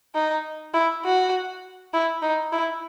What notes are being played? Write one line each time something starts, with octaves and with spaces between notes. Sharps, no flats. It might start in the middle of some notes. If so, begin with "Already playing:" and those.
D#4
E4
F#4
E4
D#4
E4